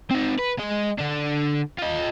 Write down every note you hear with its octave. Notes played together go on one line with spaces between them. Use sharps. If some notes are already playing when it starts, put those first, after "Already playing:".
C4 D#4
B4
G#3 D#5
D3 D4
F4 D#5